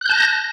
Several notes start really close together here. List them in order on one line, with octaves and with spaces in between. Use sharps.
F#6 G6 A5 A#6